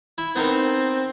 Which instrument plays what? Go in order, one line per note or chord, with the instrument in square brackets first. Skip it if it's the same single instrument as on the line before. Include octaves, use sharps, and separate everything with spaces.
[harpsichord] E4
[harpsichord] B3 D#4 A#4 [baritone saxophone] C4